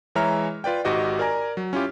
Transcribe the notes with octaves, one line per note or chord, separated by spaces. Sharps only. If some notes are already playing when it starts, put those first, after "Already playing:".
E3 G#3 C#5 E5 A#5 F6
F4 B4 D5 G5
G#1 G#2 F#4 G4 D#5 F#5
A#4 D5 G#5 A#5
F#3
C#4 E4 F4 G4